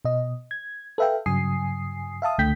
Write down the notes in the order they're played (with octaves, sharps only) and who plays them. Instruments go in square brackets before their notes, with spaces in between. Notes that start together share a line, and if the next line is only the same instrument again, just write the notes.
[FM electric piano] B2 D#5
G#6
A4 B4 E5 F5 G5
G2 C#3 F#3 G#5 D#6 C7
E5 F5 A5 D#6
C#2 D3 A3 G5 G6 B6